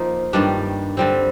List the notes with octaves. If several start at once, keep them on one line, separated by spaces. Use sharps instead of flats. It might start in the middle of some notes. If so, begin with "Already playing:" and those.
Already playing: F3 A#3 D#4
G2 D#3 G3 D4
D3 G3 C4